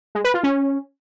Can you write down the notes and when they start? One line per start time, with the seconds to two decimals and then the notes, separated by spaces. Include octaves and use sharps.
0.15 G#3
0.24 B4
0.34 F4
0.44 C#4